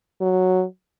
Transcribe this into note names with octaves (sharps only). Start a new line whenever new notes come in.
F#3